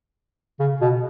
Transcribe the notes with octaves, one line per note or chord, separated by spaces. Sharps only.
C#3
B2